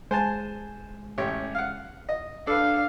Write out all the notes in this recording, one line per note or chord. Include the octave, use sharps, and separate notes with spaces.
G#3 C5 G#5 A5
A1 G4 C#5
F5 F#5
D#5
D4 A4 B4 F5